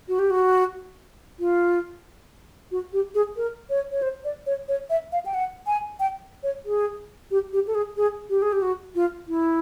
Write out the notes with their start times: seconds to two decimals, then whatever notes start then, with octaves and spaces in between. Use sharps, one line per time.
0.08 F#4
0.19 G4
0.30 F#4
1.39 F4
2.71 F#4
2.93 G4
3.15 G#4
3.37 A#4
3.70 C#5
3.91 C#5
4.02 C5
4.24 D5
4.46 C#5
4.68 C#5
4.90 E5
5.12 F5
5.26 G5
5.34 F#5
5.67 G#5
6.00 G5
6.43 C#5
6.65 G#4
7.31 G4
7.53 G4
7.67 A4
7.75 G#4
7.97 G#4
8.30 G4
8.42 G#4
8.53 G4
8.62 F#4
8.95 F4
9.28 E4